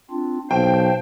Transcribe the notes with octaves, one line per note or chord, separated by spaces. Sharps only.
C4 D4 F4
B1 C5 F5 G5 A5